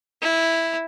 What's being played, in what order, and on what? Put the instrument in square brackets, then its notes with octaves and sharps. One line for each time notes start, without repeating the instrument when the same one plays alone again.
[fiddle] E4